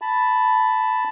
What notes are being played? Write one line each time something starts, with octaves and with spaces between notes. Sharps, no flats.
A5 B5